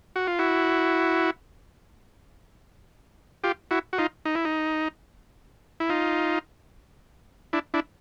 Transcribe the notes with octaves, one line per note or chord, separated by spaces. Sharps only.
F#4
F4
E4 F#4
F4 G4
E4 F#4
F#4
D#4 F4
D#4
E4
D#4
E4
D#4 F4
D4 E4
D4 E4